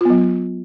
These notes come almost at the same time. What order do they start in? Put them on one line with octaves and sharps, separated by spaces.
F4 B3 F#3